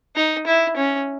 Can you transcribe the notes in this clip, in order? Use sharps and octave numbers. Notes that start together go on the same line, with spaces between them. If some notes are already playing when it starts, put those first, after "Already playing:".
D#4
E4
C#4